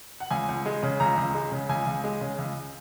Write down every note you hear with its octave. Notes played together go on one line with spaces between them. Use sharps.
F#5
C#2 G#5
C#2
G#3
C#3
C#2 A#5
C#2
G#3
C#3
C#2 G#5
C#2
G#3
C#3
C#2